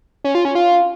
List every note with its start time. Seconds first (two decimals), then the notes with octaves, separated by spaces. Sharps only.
0.24 C#4
0.35 F4
0.45 C#4
0.55 F4